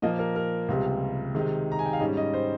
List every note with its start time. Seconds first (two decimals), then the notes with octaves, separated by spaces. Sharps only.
0.02 A#2 F3 A#3 D#5
0.19 A#4
0.36 A#4
0.69 C#2 C3 G3
1.35 C3 D#3 G#3 D#4
1.72 A#5
1.79 G#5
1.86 G5
1.93 F5
2.00 G#2 G3 C#4 D#5
2.17 D#5
2.34 C5